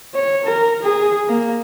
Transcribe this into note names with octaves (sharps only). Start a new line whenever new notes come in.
C#5
A#4
G#4
A#3